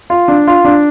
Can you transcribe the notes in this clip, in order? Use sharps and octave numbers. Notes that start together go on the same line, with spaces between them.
F4
D4
F4
D4